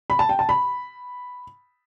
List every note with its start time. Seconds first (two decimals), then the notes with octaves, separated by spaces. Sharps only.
0.10 B5
0.19 A5
0.29 G5
0.39 A5
0.49 B5